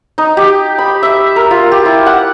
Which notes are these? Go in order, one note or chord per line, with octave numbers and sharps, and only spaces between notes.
D#4
G4
B5
E5
A#4
F4
G4
E4
F#5